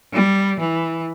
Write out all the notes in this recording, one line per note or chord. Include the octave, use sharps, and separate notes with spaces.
G3
E3